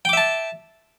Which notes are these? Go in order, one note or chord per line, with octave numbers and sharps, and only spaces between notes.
E5 G5 A5 D6